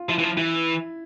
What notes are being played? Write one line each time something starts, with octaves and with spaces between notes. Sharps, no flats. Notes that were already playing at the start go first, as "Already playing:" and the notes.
Already playing: F4
F3 E4
E3
F3
E3 E4